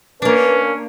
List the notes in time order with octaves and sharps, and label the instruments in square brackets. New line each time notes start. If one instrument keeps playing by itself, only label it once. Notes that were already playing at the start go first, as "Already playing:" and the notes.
[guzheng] A#3 D4 [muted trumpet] C#4 [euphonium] B4